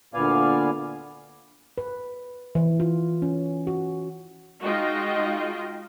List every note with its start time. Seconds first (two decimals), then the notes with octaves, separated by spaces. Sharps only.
0.14 D2 A#2 B3 D5 F5 G#5
1.78 B4
2.55 E3
2.80 F4
3.22 C#4
3.67 F#4
4.62 G#3 D#4 F4 F#4 D#5 G5